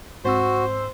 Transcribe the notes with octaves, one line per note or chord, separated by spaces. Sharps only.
G#2 C4 F#4 C5 E6